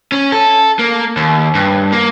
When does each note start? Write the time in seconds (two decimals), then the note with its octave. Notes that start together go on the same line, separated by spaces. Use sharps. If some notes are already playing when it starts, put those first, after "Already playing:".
0.12 C#4
0.32 A4
0.79 A#3
1.17 D#2
1.55 G2
1.92 A#3